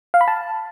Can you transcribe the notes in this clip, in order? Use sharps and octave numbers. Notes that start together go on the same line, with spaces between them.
F5
B5
A5